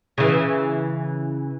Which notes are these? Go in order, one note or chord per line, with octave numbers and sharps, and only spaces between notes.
C#3 E3